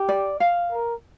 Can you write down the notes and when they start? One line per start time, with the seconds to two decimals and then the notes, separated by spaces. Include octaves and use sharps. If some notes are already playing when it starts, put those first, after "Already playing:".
Already playing: G4
0.09 D5
0.40 F5
0.72 A#4